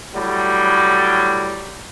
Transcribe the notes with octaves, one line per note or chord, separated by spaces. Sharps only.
A2 F#3 G3